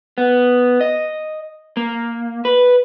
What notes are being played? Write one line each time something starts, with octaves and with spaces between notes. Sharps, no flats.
B3
D#5
A#3
B4